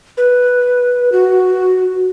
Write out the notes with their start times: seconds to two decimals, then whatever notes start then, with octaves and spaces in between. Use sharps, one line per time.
0.17 B4
1.12 F#4